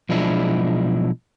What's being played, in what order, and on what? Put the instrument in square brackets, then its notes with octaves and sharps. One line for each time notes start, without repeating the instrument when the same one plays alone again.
[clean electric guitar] B1 F3 G#3 D4 E4